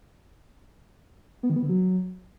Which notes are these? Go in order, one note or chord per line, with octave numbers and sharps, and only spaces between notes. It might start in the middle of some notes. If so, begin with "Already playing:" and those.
B3
D#3
B3
D3
F#3